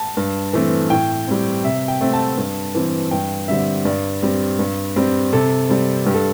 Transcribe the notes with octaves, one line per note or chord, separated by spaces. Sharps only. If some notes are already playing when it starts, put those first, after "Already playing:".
Already playing: A5
G2
E3 A3 C4
A2 G5
G3 C4
C3 E5
G5
A3 C4
A5
G2
E3 C4
G2 G5
D3 G3 C4 E5
G2 D5
G3 C4
G2
G3 C4
C3 A4
G3 C4
G2 G4
A4